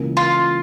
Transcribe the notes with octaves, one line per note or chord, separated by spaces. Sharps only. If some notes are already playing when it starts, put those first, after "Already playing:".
Already playing: C#2 C#3 E3 A#3
F4